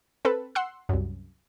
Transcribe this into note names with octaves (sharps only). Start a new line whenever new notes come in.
C4 A4 B4
F#5 C6 E6
C2 F#2